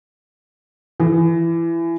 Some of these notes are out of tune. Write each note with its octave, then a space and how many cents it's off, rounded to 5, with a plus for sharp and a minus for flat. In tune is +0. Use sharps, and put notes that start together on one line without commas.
E3 +25